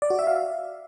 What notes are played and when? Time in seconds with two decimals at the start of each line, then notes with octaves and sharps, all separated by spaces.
0.02 D5
0.10 F#4
0.19 E5
0.27 F5
0.35 E5